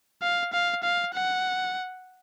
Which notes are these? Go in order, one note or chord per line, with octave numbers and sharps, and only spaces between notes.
F5
F5
F5
F#5